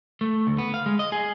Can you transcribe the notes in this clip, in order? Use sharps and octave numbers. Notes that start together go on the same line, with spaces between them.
A3
D2
B3
F5
G#3
D#5
G#4